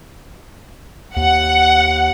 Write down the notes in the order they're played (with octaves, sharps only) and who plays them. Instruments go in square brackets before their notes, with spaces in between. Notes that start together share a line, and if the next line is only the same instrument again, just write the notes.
[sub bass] D#2 [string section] F#5